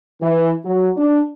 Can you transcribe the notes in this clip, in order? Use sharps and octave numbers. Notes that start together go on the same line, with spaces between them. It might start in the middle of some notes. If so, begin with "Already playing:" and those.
E3
F#3
D4